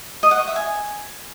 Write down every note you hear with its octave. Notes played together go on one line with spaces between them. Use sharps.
D#5
F#5
C#6
E5
G#5